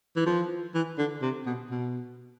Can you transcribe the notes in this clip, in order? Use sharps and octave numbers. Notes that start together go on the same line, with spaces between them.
E3
F3
E3
D3
C3
B2
B2